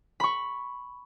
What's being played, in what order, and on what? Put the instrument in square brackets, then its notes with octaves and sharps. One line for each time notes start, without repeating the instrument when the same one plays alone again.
[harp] B5 C#6